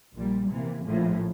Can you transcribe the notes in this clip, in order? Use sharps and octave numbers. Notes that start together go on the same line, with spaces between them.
A#1 A#2 G3
C3 E3 A#3
A#1 A2 F3